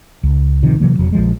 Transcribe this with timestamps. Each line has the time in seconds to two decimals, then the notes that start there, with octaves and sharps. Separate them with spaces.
0.23 C#2
0.62 A1 C3 D#3 F3
0.80 C3 E3 F#3 A#3
0.99 E1 F2 F#3
1.12 A#1 F3 G#3